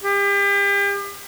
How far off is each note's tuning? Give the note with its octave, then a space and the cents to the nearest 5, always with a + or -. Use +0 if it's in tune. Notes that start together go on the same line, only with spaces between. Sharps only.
G4 +35